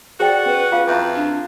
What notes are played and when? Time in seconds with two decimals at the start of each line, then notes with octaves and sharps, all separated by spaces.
0.20 F#4 G#4 C5 D5 G5
0.46 C#4 B4
0.72 F4 F5 D6
0.87 F2 E4 E5 D6
1.15 D4